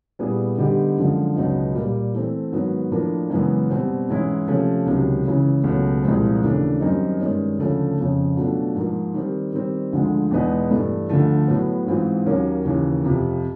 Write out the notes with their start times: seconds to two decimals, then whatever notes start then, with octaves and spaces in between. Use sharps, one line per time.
0.19 A#2 G3 B3 E4 G#4
0.58 D3 G3 B3 D#4 G4
0.97 F#2 D3 F3 G#3
1.36 C#2 B2 F#3 B3 D#4
1.75 A#2 G3 A#3
2.14 E3 A3 C4
2.52 G#2 D#3 F#3 B3
2.91 A2 F3 A#3 D4
3.30 F#2 C#3 E3 G#3 B3
3.70 B2 G3 C4
4.08 G#2 E3 G#3 C#4 E4
4.47 C3 F3 A3 C#4 F4
4.86 C#2 C3 D#3 F#3
5.26 C#2 C#3 E3
5.64 C#2 B2 F#3 A3
6.03 C2 A#2 F3 G#3 C4
6.42 D#2 C#3 E3 A3 D4
6.81 F#2 D#3 G3 C4 D#4
7.20 G2 D#3 G#3 C#4
7.58 D2 C#3 F3 A3 C#4
7.97 F2 C#3 F3
8.36 B2 F#3 A3 D4 F4
8.75 G#2 F3 A#3
9.14 D#3 G3 C4
9.53 D#3 G3 C4
9.92 D2 D3 F3 G#3
10.31 E2 B2 G#3 B3 D#4
10.70 G2 E3 A3
11.10 D2 D3 F3 A3
11.48 A2 F#3 B3
11.87 G#2 E3 G#3 C4 F4
12.25 D#2 D#3 F#3 A#3 C#4
12.65 D#2 C#3 E3
13.03 F2 C3 F3